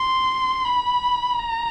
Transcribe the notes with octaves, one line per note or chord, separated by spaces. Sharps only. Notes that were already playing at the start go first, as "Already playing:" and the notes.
Already playing: C6
B5
A#5